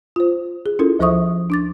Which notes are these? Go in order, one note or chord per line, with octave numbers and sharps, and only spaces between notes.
F4 C5
G#4
C#4 E4 F4 A4 A#4
D2 F3 C5 E5 C#6 D#6
D4 D6 A6